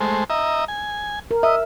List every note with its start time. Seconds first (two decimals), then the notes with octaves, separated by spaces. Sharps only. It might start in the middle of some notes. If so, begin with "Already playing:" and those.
0.01 G#3 A3 C5
0.30 D#5 E5 A#5
0.68 G#5
1.31 A#4
1.43 D#5 E5